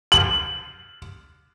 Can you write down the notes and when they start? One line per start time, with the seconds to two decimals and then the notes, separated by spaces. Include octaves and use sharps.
0.12 F#7